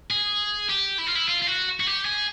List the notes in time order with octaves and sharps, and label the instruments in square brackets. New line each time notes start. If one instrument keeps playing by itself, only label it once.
[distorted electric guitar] G#4
G4
E4
F4
E4
F4
F4
F#4
F#4
G4
G#4